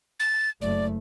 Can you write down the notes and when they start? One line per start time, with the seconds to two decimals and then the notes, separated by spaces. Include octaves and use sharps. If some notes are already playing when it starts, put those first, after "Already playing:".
0.20 A6
0.61 F#1 A3 D5